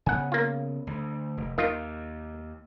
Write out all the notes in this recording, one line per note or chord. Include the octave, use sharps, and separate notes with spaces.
C#3 B3 F#5 G#5
A#3 F4
D2
F1
D#2 D#3 F4